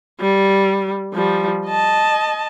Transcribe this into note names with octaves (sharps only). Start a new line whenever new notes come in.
G3
F3 G3
D#5 A5